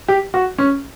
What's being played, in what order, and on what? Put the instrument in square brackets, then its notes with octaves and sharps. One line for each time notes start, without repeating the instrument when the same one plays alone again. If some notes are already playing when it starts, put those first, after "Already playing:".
[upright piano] G4
F#4
C#4